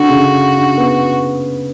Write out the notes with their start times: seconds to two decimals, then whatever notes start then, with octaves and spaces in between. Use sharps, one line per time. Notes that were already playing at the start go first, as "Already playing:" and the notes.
Already playing: D3 F#4
0.09 C#3
0.14 D3
0.56 D3
0.78 B3